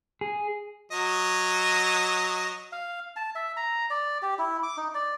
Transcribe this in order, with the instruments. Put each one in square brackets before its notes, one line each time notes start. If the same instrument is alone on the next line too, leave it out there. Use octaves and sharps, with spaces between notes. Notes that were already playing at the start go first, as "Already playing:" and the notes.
[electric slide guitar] G#4
[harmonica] F#3 D#5
[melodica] F5
A5
E5
A#5
D5
G4
E4
D6
D#4
D5